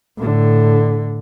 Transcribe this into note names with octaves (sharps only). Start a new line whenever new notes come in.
A2 D3